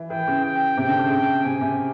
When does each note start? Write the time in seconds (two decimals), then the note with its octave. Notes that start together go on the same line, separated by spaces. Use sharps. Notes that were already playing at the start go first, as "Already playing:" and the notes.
Already playing: E3
0.10 E3 G5
0.28 C#3
0.44 G5
0.77 C3 G5
0.88 D3
0.99 C#3
1.11 C#3 G5
1.44 C3 G#5
1.61 C3